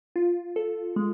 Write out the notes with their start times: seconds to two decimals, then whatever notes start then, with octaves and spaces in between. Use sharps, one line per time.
0.16 F4
0.56 A4
0.96 G#3